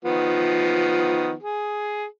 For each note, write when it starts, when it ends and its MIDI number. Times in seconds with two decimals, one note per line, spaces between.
0.05 1.34 51
0.05 1.34 53
0.05 1.34 59
1.43 2.05 68